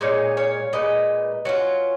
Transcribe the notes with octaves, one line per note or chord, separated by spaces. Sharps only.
A#2 G#3 D#4 C#5 F5
C#5 F5
A#2 G#3 D#4 B4 D#5
F#3 C#4 F4